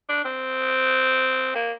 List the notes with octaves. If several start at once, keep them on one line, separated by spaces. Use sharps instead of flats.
D4
C4
A#3